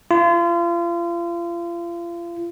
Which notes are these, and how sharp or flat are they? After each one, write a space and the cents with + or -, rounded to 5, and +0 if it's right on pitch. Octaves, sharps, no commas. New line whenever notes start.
F4 -35